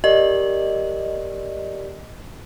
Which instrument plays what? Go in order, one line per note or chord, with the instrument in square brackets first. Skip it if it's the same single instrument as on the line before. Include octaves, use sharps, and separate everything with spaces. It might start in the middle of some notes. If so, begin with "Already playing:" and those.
[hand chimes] G4 A#4 D5 [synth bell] D#5